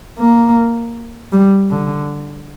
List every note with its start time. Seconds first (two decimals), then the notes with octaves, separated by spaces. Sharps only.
0.19 A#3
1.32 G3
1.70 D3